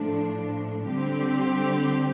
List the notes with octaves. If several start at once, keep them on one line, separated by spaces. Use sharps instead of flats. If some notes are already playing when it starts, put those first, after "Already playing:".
Already playing: A2 F3 A3 D4
D3 G3 C4 G4